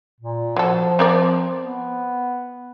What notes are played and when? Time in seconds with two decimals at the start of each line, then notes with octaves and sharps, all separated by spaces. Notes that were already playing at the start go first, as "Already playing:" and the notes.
0.21 A#2
0.56 F3 F#3 A4
0.99 C4 A#4 D5
1.61 B3